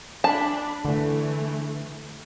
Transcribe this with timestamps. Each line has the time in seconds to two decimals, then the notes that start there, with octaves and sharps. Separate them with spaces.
0.24 D4 A5 B5
0.85 D3 E3 A3